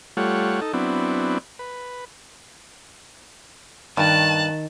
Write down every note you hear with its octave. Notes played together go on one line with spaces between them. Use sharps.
G3 A3 F4 C#5 F#5
D#4 A4
F#3 B3 C4 D4 E4
B4
G2 D#3 A5 F#6